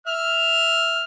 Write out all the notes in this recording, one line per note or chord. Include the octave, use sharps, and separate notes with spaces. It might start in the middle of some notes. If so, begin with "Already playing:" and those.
E5 F6